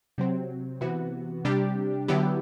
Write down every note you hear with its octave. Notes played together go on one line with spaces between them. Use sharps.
C3 F#3 C4
C3 E3 B3 F#4
C3 G3 D4 G4
D3 F#3 B3 E4 G4